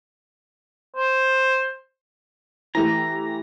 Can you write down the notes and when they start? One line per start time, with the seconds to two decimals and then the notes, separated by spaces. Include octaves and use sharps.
0.97 C5
2.75 E3 A3 G4 A#5